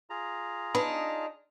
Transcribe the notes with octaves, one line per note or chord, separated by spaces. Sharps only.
F4 G#4 A#5
D4 D#4 B4